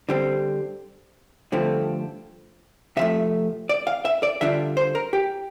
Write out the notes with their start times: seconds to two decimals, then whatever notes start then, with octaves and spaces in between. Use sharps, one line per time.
0.09 D3 G3 C4
1.52 G2 D3 F3 A3 C4
2.97 C3 F3 A3 E5
3.69 D5
3.87 F5
4.05 E5
4.23 D5
4.41 D3 G3 D4 F4 E5
4.77 C5
4.95 A#4
5.13 G4